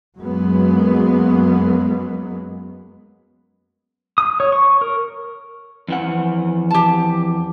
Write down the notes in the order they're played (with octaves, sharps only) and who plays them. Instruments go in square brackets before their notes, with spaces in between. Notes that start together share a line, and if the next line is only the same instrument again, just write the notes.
[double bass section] F#2 F#3 G#3 A#3 B3
[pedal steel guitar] D#6
C#5
C#6
A#4
[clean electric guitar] F2 E3 F#5
[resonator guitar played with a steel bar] G4 A5